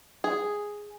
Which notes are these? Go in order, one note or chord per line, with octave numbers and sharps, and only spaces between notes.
G#4